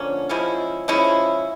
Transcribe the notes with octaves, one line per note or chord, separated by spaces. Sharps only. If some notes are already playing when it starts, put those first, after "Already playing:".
Already playing: D3 F3 A#3 C#4
F3 G#3 C#4 E4
F3 G#3 C#4 E4